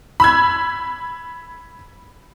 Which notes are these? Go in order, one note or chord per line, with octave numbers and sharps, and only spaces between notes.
B5 E6 G#6